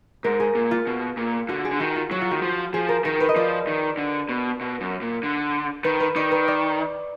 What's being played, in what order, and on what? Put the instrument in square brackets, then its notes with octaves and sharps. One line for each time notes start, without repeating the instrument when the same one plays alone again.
[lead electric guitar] G#2 [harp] A#4
[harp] G#4
[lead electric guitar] A#2
[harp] F4
[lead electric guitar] B2
A#2
[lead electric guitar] D3 [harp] F#4
[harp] G#4
[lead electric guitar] D3
[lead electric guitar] D#3 [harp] F#4
[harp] F4
[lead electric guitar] F#3 [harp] F#4
[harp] F4
[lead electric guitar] D#3 [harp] F#4
[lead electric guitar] F3
[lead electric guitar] F3 [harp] G#4
[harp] A#4
[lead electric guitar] D#3 [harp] A#4
[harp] B4
D#5
[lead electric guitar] F3 [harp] D5
[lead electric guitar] D#3
D3
B2
B2
F#2
A#2
D3
[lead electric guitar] D#3 [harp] B4
[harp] B4
[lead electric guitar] D#3 [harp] D5
[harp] B4
D5